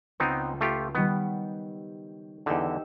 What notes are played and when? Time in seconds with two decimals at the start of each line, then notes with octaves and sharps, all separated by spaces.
0.20 C#2 B3 C4 D#4
0.61 A3 F4 G4
0.95 D#3 G3 B3
2.46 E2 D3 D#4 G4 E6